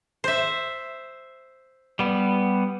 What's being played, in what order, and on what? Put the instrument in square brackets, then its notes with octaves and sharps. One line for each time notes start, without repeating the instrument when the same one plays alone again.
[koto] C5 E5
[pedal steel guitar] G3 B3